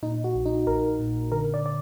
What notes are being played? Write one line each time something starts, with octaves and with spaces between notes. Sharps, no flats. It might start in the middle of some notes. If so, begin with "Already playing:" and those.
A#2 D#4
F#4
A#1
D#4
A#1 A#4
A#2
D3 A#4
D5
D5